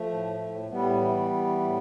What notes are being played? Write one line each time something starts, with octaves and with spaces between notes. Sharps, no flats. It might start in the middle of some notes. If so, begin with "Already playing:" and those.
Already playing: F3 A3
A2
A2
A2 G3 B3
E3
E3
A2